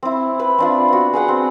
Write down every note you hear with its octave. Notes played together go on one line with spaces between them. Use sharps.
C4 E4
B4 B5
C4 D4 F4
B3 F#4
G#4 B4 F#5 G5
C4